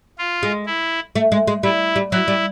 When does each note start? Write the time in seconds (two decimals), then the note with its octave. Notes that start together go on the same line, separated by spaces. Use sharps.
0.19 F4
0.43 G#3
0.66 E4
1.15 A3
1.32 G#3
1.47 G#3
1.63 G3 E4
1.96 G3
2.12 F#3 E4
2.28 G3